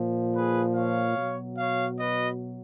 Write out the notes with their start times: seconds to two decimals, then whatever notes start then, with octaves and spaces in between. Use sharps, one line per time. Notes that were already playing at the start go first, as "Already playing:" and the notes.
Already playing: A#2 F3
0.35 G#4 B4
0.76 C#5 F5
1.17 B2 F#3
1.58 C#5 F5
1.99 B4 D#5